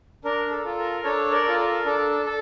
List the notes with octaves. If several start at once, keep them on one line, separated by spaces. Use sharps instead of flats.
D4 A#4
A4
F4 A4
A#4
D4 A4 C#5
A#4 D5
F4 A4
A#4
D4 A4
A4